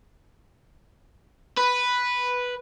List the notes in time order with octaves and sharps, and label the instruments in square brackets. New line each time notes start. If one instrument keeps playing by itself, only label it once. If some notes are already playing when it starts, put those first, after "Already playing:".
[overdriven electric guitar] B4